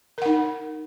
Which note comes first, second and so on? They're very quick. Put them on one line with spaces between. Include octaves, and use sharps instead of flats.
A#4 F#5 D#4